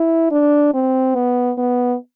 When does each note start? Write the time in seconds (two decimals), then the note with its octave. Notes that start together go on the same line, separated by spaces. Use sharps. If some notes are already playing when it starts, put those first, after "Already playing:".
Already playing: E4
0.31 D4
0.74 C4
1.15 B3
1.58 B3